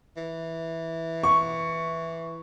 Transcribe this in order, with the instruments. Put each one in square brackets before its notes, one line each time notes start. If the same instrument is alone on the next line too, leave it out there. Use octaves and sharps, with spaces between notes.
[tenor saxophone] E3
[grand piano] C#6